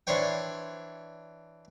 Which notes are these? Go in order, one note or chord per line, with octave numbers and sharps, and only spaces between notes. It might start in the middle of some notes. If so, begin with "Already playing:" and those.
E3 D4 C5 C#5 G5